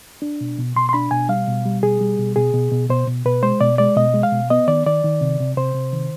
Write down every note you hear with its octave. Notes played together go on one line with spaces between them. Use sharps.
D4
B2
B2
B2 C6
C6
D4 B5
B2 G#5
G3 F5
B2
G3
B2 G#4
G3
B2
B2 G#4
B2
B2
B2 C5
B2
B2 B4
G#3 C5
B2 D5
G#3 D5
B2 D#5
G#3
F5
B2
B3 D#5
D#3 D5
D#3 D5
D#3
C3
C3
C3 C5
C3
D#3